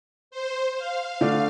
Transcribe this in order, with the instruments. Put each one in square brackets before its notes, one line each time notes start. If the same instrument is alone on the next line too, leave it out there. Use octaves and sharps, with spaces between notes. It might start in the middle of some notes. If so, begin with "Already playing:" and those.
[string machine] C5
F5
[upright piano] D3 A3 D4